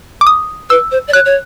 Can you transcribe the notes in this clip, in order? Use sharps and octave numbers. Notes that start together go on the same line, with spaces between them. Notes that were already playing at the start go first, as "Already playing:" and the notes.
D6
D#6
B4 E6
C5
D5
C#5 F#6
C#5